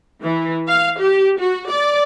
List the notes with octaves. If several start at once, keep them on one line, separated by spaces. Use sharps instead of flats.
E3
F5
G4
F#4
D5